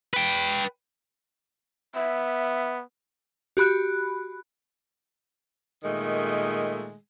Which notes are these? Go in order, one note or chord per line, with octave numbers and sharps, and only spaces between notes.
B4 G5
B3 E5
F#4 G4 B5 F#6
A#2 D#3 G#3 A3